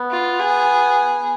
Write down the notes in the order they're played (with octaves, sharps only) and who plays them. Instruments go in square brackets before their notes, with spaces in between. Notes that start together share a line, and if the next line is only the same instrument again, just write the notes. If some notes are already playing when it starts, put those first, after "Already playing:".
Already playing: [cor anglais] B3
[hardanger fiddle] F4
G#4